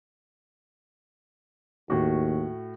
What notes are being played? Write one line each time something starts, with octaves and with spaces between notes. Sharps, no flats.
D#2 A2 F#4